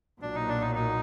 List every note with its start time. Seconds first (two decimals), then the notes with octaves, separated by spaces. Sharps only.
0.21 B1 A#2 F#3 D4
0.35 D#4
0.48 D4
0.61 D#4
0.75 D#4